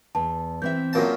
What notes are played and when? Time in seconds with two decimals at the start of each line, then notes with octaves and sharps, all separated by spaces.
0.15 E2 A5
0.62 E3 C4 E5 G6
0.93 F#2 A#2 A5